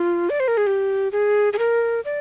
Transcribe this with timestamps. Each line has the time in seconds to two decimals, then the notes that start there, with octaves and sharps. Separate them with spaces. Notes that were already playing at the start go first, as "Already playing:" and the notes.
Already playing: F4
0.30 D5
0.40 C5
0.48 A#4
0.57 G#4
0.67 G4
1.12 G#4
1.53 G#4
1.59 A#4
2.05 D5